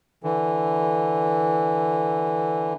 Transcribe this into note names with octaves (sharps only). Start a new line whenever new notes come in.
D3 E3